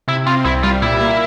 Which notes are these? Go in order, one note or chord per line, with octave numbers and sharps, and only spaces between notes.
C3 E4
C4 F4
C2 E4
G3 F4
A#2 E4
A#3